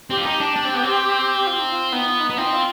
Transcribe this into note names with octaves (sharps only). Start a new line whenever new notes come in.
C4 G4
F4
D#4
D4
D4
C4
B3
C4
F4
D#4
F4
B3 D#4
F4
D#4
B3
C4 F4
D#4
F4